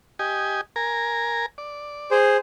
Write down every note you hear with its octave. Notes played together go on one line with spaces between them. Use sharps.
G4 D#5 G#5
A#4 G#5 A#5
D5
G#4 C5